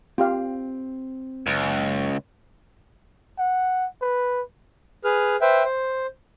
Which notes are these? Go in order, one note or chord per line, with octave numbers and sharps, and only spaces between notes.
C4 F4 G4 F5
F#1 C#2
F#5
B4
G#4 B4 F6
B4 C5 E5 G5
C5